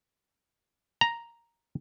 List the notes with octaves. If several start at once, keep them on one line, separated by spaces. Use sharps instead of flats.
A#5